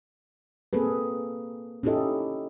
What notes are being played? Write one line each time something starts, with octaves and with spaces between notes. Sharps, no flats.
A#3 C4 G#4 A4 B4
C#4 D#4 E4 G4 A4 D#5